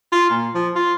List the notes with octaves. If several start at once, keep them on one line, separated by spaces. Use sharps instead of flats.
F4
A#2
F3
F4